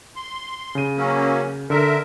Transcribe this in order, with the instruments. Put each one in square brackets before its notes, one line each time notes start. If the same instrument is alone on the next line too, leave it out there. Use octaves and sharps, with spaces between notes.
[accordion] C6
[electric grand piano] C#3 D#7
[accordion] F#3 A#3 C#4
[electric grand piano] D3 [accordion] A#4 E5